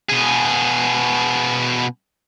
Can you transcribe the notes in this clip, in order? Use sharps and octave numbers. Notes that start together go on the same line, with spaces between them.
B2 G#4